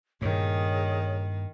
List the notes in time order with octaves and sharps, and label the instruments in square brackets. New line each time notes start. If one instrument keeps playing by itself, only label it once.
[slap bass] G2 A#2 [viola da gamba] D#3 [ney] G#4 [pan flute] C#5